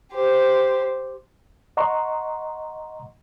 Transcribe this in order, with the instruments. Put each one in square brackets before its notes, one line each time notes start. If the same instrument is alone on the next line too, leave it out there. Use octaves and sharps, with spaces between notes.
[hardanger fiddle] G4 C5
[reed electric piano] D#5 F#5 A#5 C6 C#6